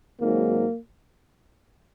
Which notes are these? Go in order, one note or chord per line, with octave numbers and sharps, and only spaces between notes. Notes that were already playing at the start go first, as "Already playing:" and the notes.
G#1 G#2 F#3 A#3